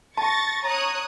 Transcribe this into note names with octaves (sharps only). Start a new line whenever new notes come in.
A5 C#6 A6 A#6
C#5 A#5 D#6 F#6